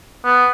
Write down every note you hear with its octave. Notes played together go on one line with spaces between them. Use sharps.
B3